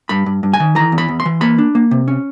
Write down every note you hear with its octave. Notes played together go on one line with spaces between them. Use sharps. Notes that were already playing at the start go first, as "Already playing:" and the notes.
G2 B5
G2
G2
G#5
D#3
E3 A#5
E2
B5
E2
C6
E3
A#3 B5
D4
A#3
C3
C#4